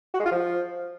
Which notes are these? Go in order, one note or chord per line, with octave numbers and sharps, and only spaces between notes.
F#4
G#3
F4
F3